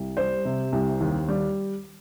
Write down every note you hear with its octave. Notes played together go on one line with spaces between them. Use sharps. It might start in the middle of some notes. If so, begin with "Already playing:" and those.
Already playing: C2
G3 C5
C3
C2
D#2
G3